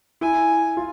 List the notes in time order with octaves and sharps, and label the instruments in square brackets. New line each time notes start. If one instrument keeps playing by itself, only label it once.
[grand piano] E4 [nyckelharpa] G#5
[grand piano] F4